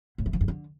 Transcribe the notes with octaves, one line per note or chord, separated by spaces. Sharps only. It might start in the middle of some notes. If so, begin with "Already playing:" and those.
A2
E3
F3
G2
D3